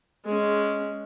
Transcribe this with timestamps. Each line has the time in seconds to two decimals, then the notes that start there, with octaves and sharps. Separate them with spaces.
0.25 G#3 C#4